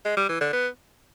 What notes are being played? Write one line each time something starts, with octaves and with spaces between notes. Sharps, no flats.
G#3
G3
E3
D3
B3